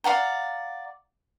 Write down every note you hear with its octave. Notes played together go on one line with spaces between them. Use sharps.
D5 F5 F#5 A#5